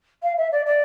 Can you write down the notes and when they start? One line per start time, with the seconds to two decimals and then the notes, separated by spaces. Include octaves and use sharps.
0.22 F5
0.37 E5
0.51 D5
0.65 D5